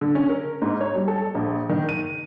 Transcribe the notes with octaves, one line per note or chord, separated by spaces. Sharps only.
D3
C#4
A#4
G#2
C#5
G3
A4
A#1
D#3
D#7